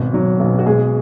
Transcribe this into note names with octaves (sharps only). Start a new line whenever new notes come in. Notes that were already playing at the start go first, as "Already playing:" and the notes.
Already playing: G#1 B2
F#3
B1
F#4
B2 G#3 G#4